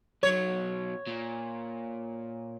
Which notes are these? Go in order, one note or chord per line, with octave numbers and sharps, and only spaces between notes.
B1 F#3 C#5
A#2